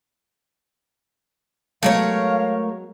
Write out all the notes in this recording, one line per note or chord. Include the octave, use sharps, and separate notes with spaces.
F#3 G#3 A3 B3 A#4 C#5 F5